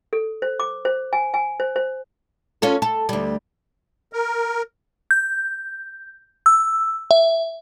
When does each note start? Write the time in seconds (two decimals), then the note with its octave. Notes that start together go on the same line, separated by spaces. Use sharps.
0.13 A4
0.42 C5
0.60 D6
0.85 C5
1.13 G#5
1.34 G#5
1.60 C5
1.76 C5
2.62 C#4 F4 A4
2.82 A4
3.09 D2 G3
4.13 A#4
5.11 G6
6.46 E6
7.11 E5